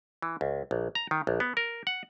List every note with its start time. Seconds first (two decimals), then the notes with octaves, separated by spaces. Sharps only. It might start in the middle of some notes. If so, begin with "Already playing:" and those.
0.22 E3
0.41 C#2
0.71 A#1
0.95 A#5
1.11 D#3
1.27 A#1
1.40 B3
1.57 A#4
1.87 F#5